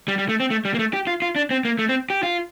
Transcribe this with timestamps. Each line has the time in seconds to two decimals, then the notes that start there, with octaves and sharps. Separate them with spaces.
0.08 G3
0.18 G3
0.29 A3
0.40 C4
0.50 A3
0.65 G3
0.74 A#3
0.79 A3
0.93 G4
1.07 F4
1.22 F4
1.36 D4
1.51 C4
1.65 A#3
1.79 A3
1.89 C4
2.10 G4
2.23 F4